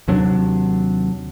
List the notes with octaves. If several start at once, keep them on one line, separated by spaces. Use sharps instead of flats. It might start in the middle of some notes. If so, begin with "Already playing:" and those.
D#2 C3 F#3 D4